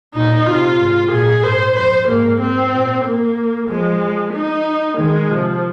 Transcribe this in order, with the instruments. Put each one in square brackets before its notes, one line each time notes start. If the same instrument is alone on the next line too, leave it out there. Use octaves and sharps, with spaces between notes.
[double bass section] A#2 [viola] D#4
[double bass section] C3 [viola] F4
[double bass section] G#2
[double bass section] A#2 [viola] G#4
[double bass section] G#2 [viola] C5
[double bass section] F2 [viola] C5
[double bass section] G#2 [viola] A#3
[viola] C4
[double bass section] A#2
[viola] A#3
[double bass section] F3 [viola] G#3
[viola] D#4
[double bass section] D#3 [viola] G#3
[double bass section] C3 [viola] F3